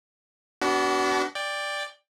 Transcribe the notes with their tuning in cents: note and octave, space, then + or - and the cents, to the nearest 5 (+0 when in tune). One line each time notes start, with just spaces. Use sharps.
B3 +0 D4 -30 F#4 +30
D5 +0 G5 +20